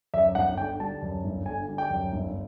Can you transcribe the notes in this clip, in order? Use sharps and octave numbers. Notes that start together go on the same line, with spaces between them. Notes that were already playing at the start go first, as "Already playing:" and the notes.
F#2 E5
G1 F#5
D3 G5
G3 A5
F#2
G1
D3 G#5
G3
G5
F#2
G1